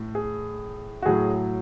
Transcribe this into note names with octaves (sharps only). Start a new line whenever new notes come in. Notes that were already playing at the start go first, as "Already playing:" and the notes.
Already playing: A2
G#4
F#4
A2 F#3 G#4